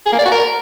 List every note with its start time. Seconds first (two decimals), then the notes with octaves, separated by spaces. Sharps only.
0.06 G#4
0.13 A#3
0.19 D5
0.25 F#4
0.32 A#4